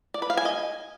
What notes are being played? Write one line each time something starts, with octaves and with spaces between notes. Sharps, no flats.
D5
B4
F5
G#5
D#5